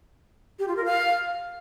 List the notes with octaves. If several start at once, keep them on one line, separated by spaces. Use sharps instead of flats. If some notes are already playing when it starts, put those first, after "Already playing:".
G4
F4
A#4
F5